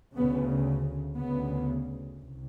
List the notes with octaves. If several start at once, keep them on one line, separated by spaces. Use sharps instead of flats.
D2 C#3 B3
D2 C#3 B3
C2